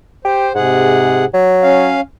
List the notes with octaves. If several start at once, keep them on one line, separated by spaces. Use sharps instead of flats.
G4 C5
G#2 C3 G#4 F#5
F#3
C#4 F5